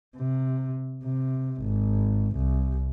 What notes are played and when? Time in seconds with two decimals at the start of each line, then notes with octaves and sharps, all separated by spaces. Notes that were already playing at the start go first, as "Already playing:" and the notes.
0.16 C3
1.04 C3
1.62 G#1
2.36 C2